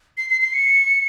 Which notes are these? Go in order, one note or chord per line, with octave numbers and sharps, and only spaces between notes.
C7
C7
C7
C#7